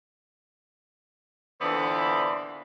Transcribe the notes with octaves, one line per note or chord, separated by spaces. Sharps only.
A#2 D3 E3 B3 C5 D5